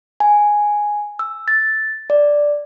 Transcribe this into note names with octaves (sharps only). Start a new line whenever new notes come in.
G#5
E6
A6
D5